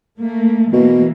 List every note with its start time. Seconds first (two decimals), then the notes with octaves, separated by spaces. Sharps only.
0.22 A3 A#3
0.73 B2 E3 A#3